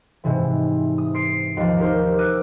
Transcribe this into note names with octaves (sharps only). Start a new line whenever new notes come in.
G#2 C3 E3
D#6
C6 C7 D7
D#2 F3
D#4 G4 A#4 C5
D6 E6 F#6 A#6 D#7